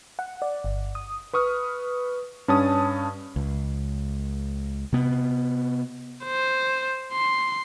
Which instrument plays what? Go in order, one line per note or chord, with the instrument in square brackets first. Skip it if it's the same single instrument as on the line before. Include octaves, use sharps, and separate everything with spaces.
[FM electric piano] F#5
D5
G1
D#6
[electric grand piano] B4 C#6 D#6 F6
G2 C#4 A5 D#6
[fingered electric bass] C#2
C3 B3
[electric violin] C5
C6